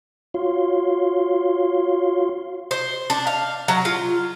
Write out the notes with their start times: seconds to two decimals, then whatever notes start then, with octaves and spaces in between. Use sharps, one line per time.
0.34 F4 F#4 C#5 F5 C6
2.71 C5
3.10 D4
3.27 F5
3.68 F#3
3.85 F4